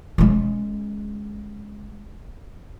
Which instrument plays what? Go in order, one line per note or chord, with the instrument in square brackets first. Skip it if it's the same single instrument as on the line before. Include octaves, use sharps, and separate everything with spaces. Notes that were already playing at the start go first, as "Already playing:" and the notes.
[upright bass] G#3 C#4